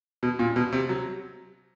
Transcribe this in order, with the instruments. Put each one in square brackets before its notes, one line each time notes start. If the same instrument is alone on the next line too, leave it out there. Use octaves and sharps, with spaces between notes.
[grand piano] B2
A#2
B2
C3
F#3